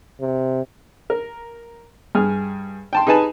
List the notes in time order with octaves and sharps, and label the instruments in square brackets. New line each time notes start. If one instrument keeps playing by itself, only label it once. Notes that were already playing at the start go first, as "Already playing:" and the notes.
[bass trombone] C3
[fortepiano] A#4
G2 G#4 F6
G5 A5 C6
D#4 G#4 B4 G#5 A5